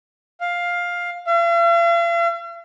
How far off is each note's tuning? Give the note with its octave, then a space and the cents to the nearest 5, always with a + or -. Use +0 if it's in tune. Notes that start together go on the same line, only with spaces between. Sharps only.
F5 +10
F5 -45